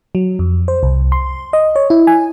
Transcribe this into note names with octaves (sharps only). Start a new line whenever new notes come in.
F#3
F2
C5
C2
C6
D#5
C#5
E4
G#5